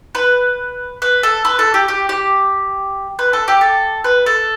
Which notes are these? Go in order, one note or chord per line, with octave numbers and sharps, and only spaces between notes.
B4
B4
A4
B4
A4
G4
G4
G4
B4
A4
G4
A4
B4
A4